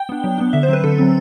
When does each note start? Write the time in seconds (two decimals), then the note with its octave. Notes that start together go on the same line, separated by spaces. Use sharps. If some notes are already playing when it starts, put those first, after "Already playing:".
Already playing: G5
0.09 B3 D4
0.24 F#3
0.38 B3 D4
0.53 D3 E5
0.63 C5
0.69 F#3 C4 B4
0.84 D3 A4
0.98 F#3 C4